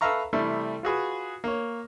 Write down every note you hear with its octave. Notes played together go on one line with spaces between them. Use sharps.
A4 B4 E5 F5 A#5 C#6
C3 E3 G3 A3
F4 F#4 G#4 B4
A#3 C#5